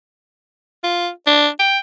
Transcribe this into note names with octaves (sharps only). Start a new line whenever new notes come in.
F4
D4
G5